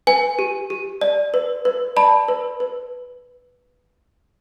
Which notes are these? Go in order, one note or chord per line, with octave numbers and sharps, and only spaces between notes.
B4 G#5
G4
G4
D5
B4
B4
D5 A5 B5
B4
B4